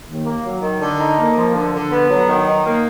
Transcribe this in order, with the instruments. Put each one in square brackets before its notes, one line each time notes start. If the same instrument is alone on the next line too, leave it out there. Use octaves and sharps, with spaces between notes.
[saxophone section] D#2
A#3
F#3
D#3
D3
D#4
A#3
F3
D3
D3
B3
F#3
D#3
D#4
A#3